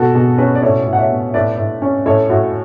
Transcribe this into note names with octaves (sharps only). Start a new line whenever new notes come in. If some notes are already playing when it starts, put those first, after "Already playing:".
Already playing: B2 F#4 A4
B2 G#4
C#4 G#4 B4
D5
A2 A4 C#5
A2
F#5
C#5 E5
B3
A2 B4 D5
A2
C#4
A2 A4 C#5
A2 F#4